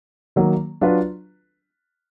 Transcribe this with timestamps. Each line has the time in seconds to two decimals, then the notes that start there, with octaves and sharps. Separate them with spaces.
0.36 D#3 F#3 A#3
0.81 F#3 D4 F4 B4